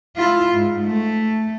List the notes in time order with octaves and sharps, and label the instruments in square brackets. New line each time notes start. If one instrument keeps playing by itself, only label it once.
[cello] E4 F4
G#2
A3